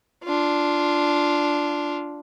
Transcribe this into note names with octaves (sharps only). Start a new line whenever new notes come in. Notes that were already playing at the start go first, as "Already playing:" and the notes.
D4 F4